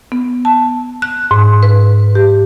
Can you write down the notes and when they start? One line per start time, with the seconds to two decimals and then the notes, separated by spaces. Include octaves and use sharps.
0.12 B3
0.45 A5
1.02 F#6
1.31 G#2
1.63 B4
2.15 G4